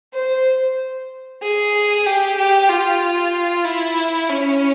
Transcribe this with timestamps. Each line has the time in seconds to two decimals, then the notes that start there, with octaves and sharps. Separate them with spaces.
0.14 C5
1.42 G#4
2.06 G4
2.38 G4
2.69 F4
3.65 E4
4.30 C#4